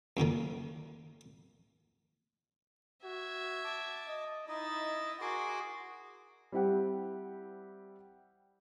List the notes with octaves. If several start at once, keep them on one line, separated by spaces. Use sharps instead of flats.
F#2 A#2 D3 D#3
F#4 E5 G#6
A5 D6
D#5
D#4 E4 D#5 A6
F#4 G#4 A#4 C6 D6
G3 C4 E4 G4 F#5